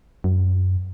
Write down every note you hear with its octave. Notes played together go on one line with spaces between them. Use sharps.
F#2